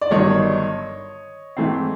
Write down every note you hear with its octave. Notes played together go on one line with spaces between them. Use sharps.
D5
G1 G2 D#3 F#3 C#5 D#5
G#2 E3 A3 C4